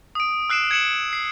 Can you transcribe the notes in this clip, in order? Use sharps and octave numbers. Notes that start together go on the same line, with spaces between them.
D#6 D7
E6 F#6 C7 D7 E7
G#6 C#7 E7 F#7
C7